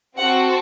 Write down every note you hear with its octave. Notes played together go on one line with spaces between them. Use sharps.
C4 F#4 A4 F#5